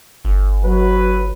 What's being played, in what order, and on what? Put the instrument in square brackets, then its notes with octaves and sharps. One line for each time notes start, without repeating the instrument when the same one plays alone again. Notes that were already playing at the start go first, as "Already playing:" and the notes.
[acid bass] G1
[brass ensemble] F#3 B4